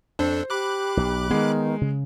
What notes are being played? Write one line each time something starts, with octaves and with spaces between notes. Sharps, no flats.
F2 D4 A4 C5
G4 B5 D6 F#6
B1
D#3 G#3 B3
C#3